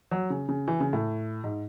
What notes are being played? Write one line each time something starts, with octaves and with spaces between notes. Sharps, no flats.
F#3
C#3
C#3
E3
C#3
A2
G#2